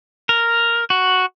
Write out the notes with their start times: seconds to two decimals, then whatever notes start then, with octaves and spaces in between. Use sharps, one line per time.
0.29 A#4
0.90 F#4